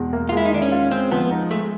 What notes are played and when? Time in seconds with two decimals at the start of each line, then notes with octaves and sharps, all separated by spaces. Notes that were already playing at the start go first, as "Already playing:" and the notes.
Already playing: E2 B2 G#3
0.13 A#3
0.29 F4
0.32 G#3 E4
0.45 D#4
0.52 D#3 D4
0.62 C#4
0.72 F4
0.91 G#3 C4
1.12 F3 B3
1.31 D#4
1.51 G#3 A3